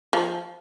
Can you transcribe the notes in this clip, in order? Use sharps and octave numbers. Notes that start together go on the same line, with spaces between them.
F3